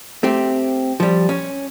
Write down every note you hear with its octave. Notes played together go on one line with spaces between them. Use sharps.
A3 C4 G4
F3 G3
C#4